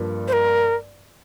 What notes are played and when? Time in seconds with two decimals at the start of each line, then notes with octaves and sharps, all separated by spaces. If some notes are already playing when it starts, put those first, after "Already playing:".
Already playing: G2 F3 A#3
0.28 C5
0.33 A#4